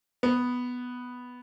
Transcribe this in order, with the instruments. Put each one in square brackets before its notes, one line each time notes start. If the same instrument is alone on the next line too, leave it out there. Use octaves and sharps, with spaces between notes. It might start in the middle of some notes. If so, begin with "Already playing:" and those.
[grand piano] B3